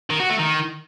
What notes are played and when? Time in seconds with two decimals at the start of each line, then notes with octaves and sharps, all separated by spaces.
0.10 D#3
0.20 F#4
0.29 A3
0.39 D#3